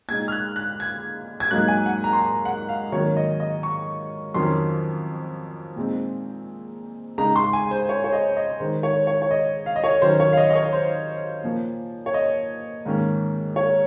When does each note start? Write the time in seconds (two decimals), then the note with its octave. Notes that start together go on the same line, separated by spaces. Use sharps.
0.08 A#2 G#3 D#4 G#6
0.28 F6
0.32 F#6
0.56 F#6
0.80 G#6
1.40 G#6
1.51 G#2 F#3 A#3 D#4 F#6
1.68 G#5
1.86 F#5
2.04 A#5
2.13 C6
2.22 A#5
2.45 F#5
2.69 F5
2.92 G#2 D#3 F#3 A#3 C#4 C#5
3.16 D#5
3.40 D#5
3.63 C#6
4.34 F2 D#3 F#3 C#4 C6
5.76 A#2 G#3 C4 D#4
7.18 C#3 G#3 D#4 A#5
7.36 C6
7.53 G#5
7.71 C5
7.89 C#5
8.04 C#5
8.13 D#5
8.36 D#5
8.60 D#3 G#3 D#4 C5
8.83 C#5
9.07 C#5
9.22 C#5
9.31 D#5
9.66 F5
9.76 D#5
9.84 C#5
10.02 D#3 F#3 C#4 C5
10.20 C#5
10.33 F5
10.37 D#5
10.50 D#5
10.55 C#5
10.72 C5
11.44 A#2 F3 A#3
12.06 C#5
12.14 D#5
12.85 G#2 D#3 A#3 C#4
13.56 C#5